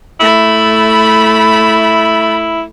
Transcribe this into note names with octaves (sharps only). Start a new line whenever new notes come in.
A3 E4 B5